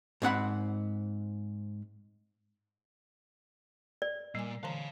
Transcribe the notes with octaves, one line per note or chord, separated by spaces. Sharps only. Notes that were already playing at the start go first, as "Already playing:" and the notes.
G#2 C4 F#5 B5
D5
A#2 G3 G#5
D3 E3 C#5 F5 A#5